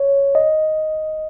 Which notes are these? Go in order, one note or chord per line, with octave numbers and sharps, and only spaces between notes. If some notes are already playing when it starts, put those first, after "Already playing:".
Already playing: C#5
D#5